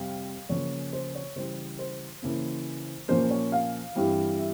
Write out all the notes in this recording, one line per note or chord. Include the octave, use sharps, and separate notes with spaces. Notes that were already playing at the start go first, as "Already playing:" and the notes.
Already playing: F2 C3 G3 C4 F5
C#3 F3 A#3 C#4 C#5
C5
C#5
C#3 E3 G3 C5
C5
C#3 E3 A#3 C#4
A#2 F3 A#3 C#4 C5
C#5
F5
G2 E3 G3 C4
E5